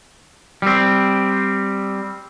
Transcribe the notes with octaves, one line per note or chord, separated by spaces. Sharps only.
G3 C4